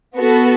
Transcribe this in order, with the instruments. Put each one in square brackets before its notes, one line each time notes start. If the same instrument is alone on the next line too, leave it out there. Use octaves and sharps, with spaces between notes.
[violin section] B3 F#4 A4